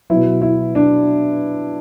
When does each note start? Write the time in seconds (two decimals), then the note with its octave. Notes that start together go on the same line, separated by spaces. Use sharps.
0.10 B2 F#3 E4
0.42 E4
0.75 D4